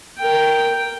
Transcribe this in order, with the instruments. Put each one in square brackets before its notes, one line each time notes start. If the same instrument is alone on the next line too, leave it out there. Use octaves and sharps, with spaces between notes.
[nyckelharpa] A#4 G5